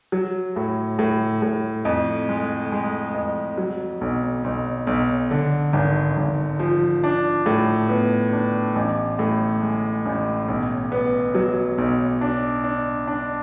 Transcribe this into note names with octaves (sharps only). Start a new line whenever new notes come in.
F#3
A2
A2
A2
F2
G#3
G#3
F2
F#3
B1
B1
B1
D3
G#1
G#1
F3
D4
A2
B3
D4
A1
A2
G#3
A1
B1
B3
F#3
B1
D4
D4
D4